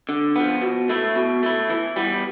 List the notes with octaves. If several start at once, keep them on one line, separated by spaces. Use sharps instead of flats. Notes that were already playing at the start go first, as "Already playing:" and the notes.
D3
F3 B3
B2
A3 E4
B2
A3 E4
E3
G3 B3